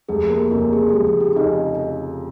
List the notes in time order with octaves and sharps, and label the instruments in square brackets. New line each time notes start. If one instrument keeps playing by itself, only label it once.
[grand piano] F1 [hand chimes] G#4
[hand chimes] A#3 A#4
[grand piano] F2 C#3 [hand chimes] A#3 A#4
[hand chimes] G#4
[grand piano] F1 [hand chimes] G4
[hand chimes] G#4
G4
[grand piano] F2 C#3 [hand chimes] D#4 D#5